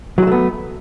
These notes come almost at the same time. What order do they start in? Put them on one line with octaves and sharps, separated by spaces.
F#3 G#3 A3 B3